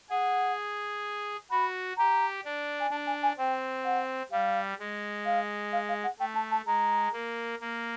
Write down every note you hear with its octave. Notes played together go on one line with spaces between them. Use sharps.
G#4 F#5
F#4 B5
G4 A#5
D4
G#5
D4 A5
G#5
G#5
C4 G5
F#5
G3 F5
G#3
F5
F5
F5
F#5
A3 G5
A5
A5
G#3 A#5
A#3
A#3